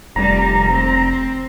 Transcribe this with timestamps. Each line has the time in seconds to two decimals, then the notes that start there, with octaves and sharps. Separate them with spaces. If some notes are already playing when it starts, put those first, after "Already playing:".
0.16 F1 G3 A#5
0.72 C4